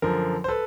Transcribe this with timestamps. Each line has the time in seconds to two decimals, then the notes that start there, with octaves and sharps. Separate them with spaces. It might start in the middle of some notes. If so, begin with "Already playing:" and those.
0.02 F#2 D3 F3 A#4
0.44 C5
0.48 A4 B4